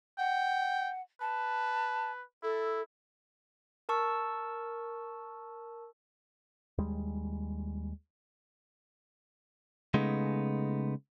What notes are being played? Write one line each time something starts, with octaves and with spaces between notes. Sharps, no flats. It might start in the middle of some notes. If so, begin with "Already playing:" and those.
F#5 G5
B4 A5
E4 A4
A#4 A5 C#6 E6
D#2 G3 G#3
C#3 G#3 A3 B3 D#4